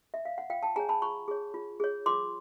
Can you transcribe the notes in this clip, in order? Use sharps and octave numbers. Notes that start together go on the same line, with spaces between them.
E5
F5
F#5
F4 F5 G5
G5 A5
G#4 C#5 G#5 A#5
A5 B5
F4 B5 C#6
G#4 C#5
F4
G#4 C#5
F4 C6 D6